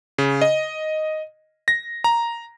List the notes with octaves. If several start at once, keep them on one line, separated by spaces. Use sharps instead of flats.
C#3
D#5
A#6
A#5